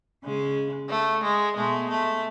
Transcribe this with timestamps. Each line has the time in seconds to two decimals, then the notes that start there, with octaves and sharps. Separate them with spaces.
0.23 C#3 G#3
0.89 A3
1.23 G#3
1.55 B2 G#3 A3
1.88 A3